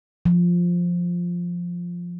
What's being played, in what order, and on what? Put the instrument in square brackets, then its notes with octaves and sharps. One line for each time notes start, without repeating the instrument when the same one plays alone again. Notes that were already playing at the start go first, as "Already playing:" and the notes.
[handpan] F3